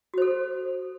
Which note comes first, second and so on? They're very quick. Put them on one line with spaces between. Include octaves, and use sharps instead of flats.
F#4 C5 A4